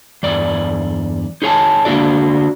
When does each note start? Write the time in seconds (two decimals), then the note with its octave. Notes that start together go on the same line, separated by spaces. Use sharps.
0.23 E2 G2 D5
1.42 D#4 G#4 C#5 G#5 A5
1.85 D3 A#3 D4 F#4 D5